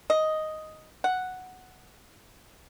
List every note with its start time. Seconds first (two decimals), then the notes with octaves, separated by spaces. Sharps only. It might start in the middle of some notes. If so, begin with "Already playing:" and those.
0.10 D#5
1.04 F#5